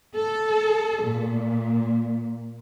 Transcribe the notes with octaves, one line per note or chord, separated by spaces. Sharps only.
A4
A#2